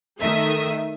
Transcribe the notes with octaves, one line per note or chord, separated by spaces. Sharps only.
D#3 A3 E5 D#6